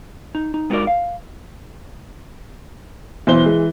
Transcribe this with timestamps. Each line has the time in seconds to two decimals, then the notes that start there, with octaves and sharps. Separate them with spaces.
0.35 D#4
0.54 D#4
0.70 G#3 B3 D#4 F#4 A#4 D5
0.87 F5
3.27 B1 E3 C5 G7
3.46 G#3